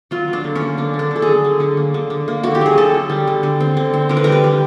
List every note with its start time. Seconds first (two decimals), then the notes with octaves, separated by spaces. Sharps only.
0.11 F#3 F4
0.28 F#3
0.33 D4
0.44 D3
0.56 C#4
0.61 A#3
0.77 D3 D4
0.94 D3
0.99 D4
1.11 D3 A4
1.22 G#4
1.27 F#3
1.44 D3
1.60 D3
1.77 A#3
1.94 D3
2.10 D3
2.28 A#3
2.43 D3 F#4
2.55 G4
2.61 F#3 G#4
2.78 D3 A4
2.94 D3
3.10 G3
3.27 D3
3.43 D3
3.60 C4
3.77 D3
3.94 C4
4.09 D3 A#4
4.17 B4
4.24 G3 A#4
4.32 B4
4.44 G3